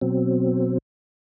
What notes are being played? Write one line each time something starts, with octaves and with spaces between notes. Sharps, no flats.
B2 F#3 C4